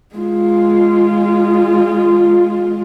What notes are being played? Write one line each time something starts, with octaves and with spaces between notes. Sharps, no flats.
G#3 F4